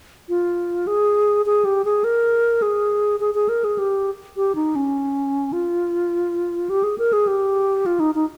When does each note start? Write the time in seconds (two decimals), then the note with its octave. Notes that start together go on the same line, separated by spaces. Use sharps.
0.29 F4
0.87 G#4
1.46 G#4
1.65 G4
1.85 G#4
2.04 A#4
2.62 G#4
3.20 G#4
3.35 G#4
3.49 A#4
3.64 G#4
3.78 G4
4.37 G4
4.55 D#4
4.76 C#4
5.53 F4
6.70 G4
6.83 G#4
6.98 A#4
7.13 G#4
7.27 G4
7.86 F4
8.00 D#4
8.15 D#4